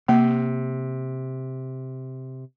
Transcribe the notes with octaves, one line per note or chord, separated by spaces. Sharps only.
C3 A#3